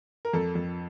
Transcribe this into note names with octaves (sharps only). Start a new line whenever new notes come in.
A#4
F2 A4
F2